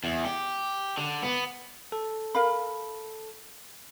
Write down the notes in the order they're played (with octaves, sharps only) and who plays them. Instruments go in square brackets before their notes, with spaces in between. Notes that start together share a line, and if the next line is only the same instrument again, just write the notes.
[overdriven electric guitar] E2
G4
D3
B3
[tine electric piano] A4
[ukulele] A#4 F5 B5